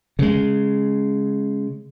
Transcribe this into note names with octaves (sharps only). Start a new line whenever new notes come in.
C#3 G#3